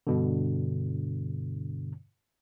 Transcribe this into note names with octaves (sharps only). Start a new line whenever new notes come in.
G2 B2 D3